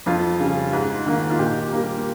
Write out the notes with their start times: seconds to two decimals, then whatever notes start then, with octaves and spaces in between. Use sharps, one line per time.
0.06 F2 F4
0.40 C#3 G3
0.73 G#2
1.06 D#3 A#3
1.30 F4
1.39 A#2 G4
1.73 G3 A#3